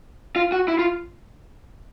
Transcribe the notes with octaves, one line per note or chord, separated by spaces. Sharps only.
F4
F#4
E4
F4